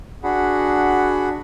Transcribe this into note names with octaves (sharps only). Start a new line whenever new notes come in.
D4 F#4 G#4 F#5 B5